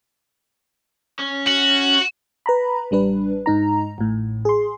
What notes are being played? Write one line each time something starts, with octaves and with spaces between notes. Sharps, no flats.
C#4
F#4
B4 A#5 B5
A1 G3 D4 B4
G#2 D#4 A#5
A1 A2
G#4 C6